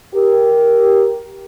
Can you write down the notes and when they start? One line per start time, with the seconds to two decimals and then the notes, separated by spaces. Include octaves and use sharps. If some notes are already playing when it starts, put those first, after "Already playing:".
0.14 G4 A#4